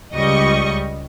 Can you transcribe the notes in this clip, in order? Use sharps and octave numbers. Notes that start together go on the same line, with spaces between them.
C#2 G3 D#5 C#6